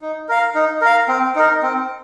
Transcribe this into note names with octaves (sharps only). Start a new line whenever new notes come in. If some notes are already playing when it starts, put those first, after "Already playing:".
D#4
A#4 F5
D#4
A#4 F5
C4
D#4 A#4
C4